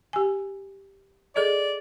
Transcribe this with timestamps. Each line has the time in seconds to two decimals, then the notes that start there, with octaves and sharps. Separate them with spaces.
0.13 G4 G#5
1.36 G#4 A4 D5 D#5